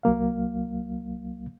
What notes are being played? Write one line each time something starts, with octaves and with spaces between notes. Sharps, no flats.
C2 F#3 A#3 F5